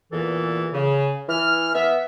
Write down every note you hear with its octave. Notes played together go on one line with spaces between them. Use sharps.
E2 A#2 E3 A4
C#3
E3 F6
B3 E5